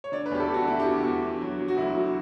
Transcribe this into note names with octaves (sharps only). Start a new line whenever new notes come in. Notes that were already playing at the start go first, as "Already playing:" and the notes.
C#5
D3 D5
B4
E2 G4
A4
D3 G4
F#4
D3 E4
G4
E2 F#4
E2 F#4
D3
F#3
F#3
F#4
D2 E4
F#3